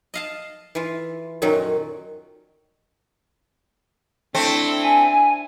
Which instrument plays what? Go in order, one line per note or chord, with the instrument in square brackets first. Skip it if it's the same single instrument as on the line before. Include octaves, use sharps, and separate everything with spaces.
[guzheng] D#5 F5 A5
E3 F4
F#2 A#2 D#3 F#3
[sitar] A3 C4 [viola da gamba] D4 E4
[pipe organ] G#5